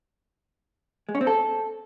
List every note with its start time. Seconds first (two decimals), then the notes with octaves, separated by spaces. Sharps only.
1.09 G#3
1.15 C#4
1.21 C4
1.27 A4